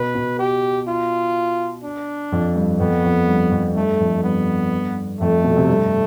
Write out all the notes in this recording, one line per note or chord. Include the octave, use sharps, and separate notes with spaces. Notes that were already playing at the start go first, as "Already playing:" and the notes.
Already playing: B2 B4
B2
G4
F4
D4
F2
G2
F2 B3
F2
G2
F2
G2 A3
F2
G2 B3
F2 A3
B2
C3
G2